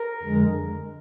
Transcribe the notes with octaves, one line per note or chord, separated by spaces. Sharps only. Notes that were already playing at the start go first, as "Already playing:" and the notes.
Already playing: A#4
F2 D3 G#3